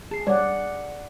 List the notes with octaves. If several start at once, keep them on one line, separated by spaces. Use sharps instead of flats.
G#4 A5 C7
G3 C#5 D5 F#5